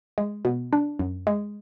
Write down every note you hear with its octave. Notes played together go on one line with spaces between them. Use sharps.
G#3
B2
D4
F#2
G#3